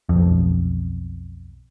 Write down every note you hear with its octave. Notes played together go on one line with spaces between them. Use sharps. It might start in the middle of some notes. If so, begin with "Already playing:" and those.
B1 F2